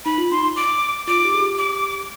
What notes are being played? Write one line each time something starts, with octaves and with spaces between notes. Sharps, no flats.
D#4 B5
F4
D#4 C6
D6
F4 D6
G4
G#4
G4
D6